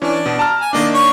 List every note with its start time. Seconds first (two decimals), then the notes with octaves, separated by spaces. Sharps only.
0.02 E3 C#4 D4
0.26 B2
0.39 A5 A#5 F6
0.61 G#5
0.73 D#3 A#3 D4 D5 D#5 D6
0.94 C#5